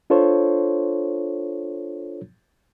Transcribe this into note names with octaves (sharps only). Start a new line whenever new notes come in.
D4 F4 A4 C5 C#5